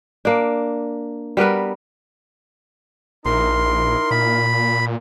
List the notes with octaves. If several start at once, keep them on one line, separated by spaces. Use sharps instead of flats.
A#3 D4
G3 B3 A#4 B4
A#1 D#4 E4 A#4 C6
A#2 B5